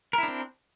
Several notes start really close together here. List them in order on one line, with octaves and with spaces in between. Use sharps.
A#4 E4 D4 C4